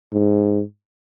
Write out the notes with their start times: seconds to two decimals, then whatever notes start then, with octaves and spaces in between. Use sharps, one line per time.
0.13 G#2